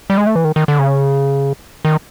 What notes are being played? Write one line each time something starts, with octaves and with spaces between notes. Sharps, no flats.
G3
G#3
A3
E3
D#3
D#3
D3
C#3
D#3